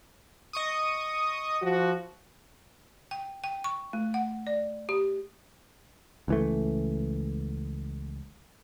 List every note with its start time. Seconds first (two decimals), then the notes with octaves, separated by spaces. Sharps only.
0.53 D#5 C#6 D#6
1.62 F3 F#4
3.11 G5
3.44 G5
3.64 C#6
3.93 A3
4.14 F#5
4.47 D5
4.89 G4
6.28 C#2 E3 A3